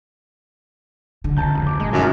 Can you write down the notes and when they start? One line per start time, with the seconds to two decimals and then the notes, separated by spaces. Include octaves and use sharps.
1.24 D3
1.37 C#2 A5 A#5 G6
1.54 F1
1.66 F#1 D6
1.80 A#2 G#3
1.93 F#2 D#3 F4